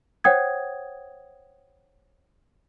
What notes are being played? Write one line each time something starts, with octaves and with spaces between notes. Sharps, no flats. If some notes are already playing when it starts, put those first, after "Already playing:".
C5 C#5 F#5 G5 D#6 G#6